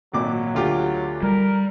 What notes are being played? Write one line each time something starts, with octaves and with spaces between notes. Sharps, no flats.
G#1 A#2 F#3 D6
D2 F4 G4
G3 A#4